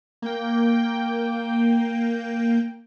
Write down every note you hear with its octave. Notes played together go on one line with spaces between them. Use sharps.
A#3 G5